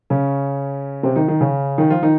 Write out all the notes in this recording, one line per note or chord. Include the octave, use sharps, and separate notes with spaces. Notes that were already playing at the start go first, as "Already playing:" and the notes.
C#3 C#4
C3 C4
D#3 D#4
D#3 D#4
C#3 C#4
D#3 D#4
F3 F4
D#3 D#4